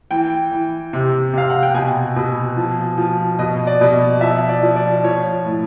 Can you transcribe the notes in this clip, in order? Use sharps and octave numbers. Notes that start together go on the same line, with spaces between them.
E3 G5
E3
C3
C3 F5
F#5
G5
B2 G#5
B2
F3
F3
B2 D#5
D5
B2
F3 E5
D5
F3
D5
F3 C#5
A2